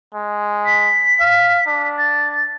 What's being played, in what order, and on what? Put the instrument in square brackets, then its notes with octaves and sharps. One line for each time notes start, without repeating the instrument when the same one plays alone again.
[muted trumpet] G#3
[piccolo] B6
[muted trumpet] F5
D4
[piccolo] A6